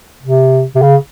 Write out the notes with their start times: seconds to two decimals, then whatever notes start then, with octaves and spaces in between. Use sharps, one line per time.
0.22 C3
0.75 C3
0.82 C#3